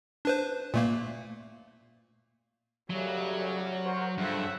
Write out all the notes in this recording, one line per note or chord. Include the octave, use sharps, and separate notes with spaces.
D4 B4 C5
A#2 A3 A#3
F#2 A2 C#3 F#3 G3
F#4 A#4 C5
G2 C#3 F3 A3 E5 F#5